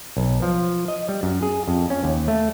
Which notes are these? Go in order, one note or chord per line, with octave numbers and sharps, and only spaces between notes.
B1
F3
D#5
G3
F#2
G#4
F2
C#4
D#2
A3